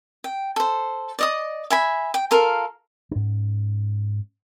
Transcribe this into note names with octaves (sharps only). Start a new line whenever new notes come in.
G5
A4 C5
D5 D#5 D#6
E5 G#5 B5
G5
F4 A4 A#4 F5
G#2 C#4